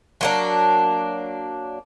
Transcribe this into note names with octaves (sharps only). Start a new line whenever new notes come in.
F#3 A#3 D4